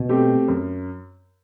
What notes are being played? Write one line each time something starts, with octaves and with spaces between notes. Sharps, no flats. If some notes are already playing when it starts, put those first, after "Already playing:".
Already playing: B2
A3 C4 G4
F#2